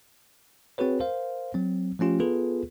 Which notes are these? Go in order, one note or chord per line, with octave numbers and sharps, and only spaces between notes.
C4 F#4 G#4 B4 C#5
A#4 C5 F5
F#3 C4
F3 A3 C#4 F4 G4
B3 F4 G#4 A4 B4